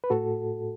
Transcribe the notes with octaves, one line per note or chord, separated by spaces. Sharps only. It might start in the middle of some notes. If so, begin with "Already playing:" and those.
B4
A2 F#4 A4